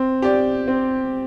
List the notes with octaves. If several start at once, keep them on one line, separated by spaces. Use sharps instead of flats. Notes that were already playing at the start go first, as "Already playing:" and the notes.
Already playing: C4
G4 D5
C4